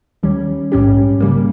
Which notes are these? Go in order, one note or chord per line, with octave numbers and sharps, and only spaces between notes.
D#2 D#3 G3 C#4
A#1 G#2 G3 C#4 G4
C#3 G3 A#3